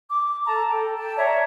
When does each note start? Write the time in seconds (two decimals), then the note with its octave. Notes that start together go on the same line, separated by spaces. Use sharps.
0.11 D6
0.46 A4 A5 A#5
0.68 A4 G5
0.96 G5 A5
1.16 C#5 D5 E5 A#5